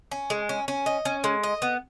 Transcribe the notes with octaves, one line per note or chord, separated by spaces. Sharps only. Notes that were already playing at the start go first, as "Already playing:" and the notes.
C#4
G#3
C#4
C#4
D#5
C#4
G#3
D#5
B3